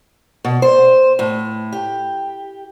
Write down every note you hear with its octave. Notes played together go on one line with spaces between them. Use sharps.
B2
C5
A2
G4